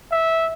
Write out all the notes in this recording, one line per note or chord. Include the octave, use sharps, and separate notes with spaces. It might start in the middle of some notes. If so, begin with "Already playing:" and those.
E5